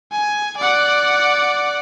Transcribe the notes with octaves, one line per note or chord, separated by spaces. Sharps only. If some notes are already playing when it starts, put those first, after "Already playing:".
G#5
D5 F#5